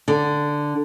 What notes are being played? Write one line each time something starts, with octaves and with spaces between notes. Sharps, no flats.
D3